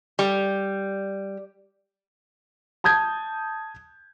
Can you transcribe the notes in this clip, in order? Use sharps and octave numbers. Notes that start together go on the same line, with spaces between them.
G3
A5 D#6 G6 G#6